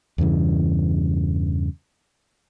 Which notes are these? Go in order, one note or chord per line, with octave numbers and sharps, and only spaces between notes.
E2 G2 C#3 E3